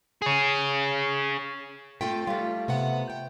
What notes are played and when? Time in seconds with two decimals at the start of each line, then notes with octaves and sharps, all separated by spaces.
0.22 G#4 C#5
2.01 A3 C4 F4 G5
2.27 G3 A3 F4
2.68 C3 B3 F#5
3.10 G5